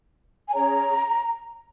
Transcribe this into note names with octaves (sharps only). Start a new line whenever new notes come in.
G#5
C#4 G#4 C#5 A#5